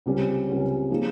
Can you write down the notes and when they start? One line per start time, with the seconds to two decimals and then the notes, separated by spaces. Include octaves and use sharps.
0.06 C#2 C3 G3 C#4
0.48 C#2 C3 G3 C#4
0.90 F3 A#3 D#4 G#4